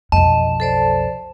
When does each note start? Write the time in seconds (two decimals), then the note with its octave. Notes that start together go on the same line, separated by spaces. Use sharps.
0.12 B1 F2 D#5 A5
0.60 A4 C5 D5